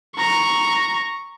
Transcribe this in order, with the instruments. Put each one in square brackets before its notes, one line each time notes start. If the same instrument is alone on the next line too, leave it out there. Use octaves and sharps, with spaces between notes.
[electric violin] A#5 C#6